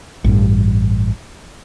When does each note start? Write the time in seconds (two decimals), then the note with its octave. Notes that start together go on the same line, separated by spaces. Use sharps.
0.24 A1 G2